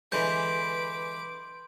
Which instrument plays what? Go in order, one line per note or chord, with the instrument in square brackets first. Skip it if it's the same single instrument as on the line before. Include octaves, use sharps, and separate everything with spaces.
[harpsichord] D3 E3 G#3 [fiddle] B4 D6 [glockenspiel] B5 C6 G6